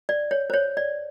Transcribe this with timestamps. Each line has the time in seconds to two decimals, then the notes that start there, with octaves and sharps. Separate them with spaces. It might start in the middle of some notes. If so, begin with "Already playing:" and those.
0.09 D5
0.31 C#5
0.50 C5
0.54 C#5
0.77 D5